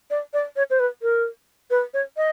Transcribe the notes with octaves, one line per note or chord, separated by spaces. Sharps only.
D5
D5
C#5
C5
B4
A#4
B4
C#5
D#5